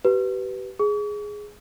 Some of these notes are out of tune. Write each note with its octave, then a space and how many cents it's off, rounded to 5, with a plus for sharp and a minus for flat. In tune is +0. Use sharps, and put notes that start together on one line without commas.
G4 -30 B4 +0
G#4 +0 C#6 +45